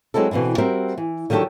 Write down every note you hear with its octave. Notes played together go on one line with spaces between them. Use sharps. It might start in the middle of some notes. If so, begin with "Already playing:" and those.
F#3 G#3 C4 E4 A4
B2 D3 E3 C4 E4
G3 C4 F#4 G4 A#4 E5
E3
D3 D#3 F#3 G4 A4